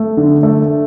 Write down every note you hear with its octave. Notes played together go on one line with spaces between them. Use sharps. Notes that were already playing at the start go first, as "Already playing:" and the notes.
Already playing: A3
D3
A3